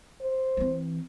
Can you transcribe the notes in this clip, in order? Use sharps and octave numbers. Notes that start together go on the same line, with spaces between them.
C5
E3 C4